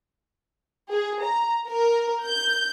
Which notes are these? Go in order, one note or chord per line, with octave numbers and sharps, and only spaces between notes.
G#4
A#5
A#4
G6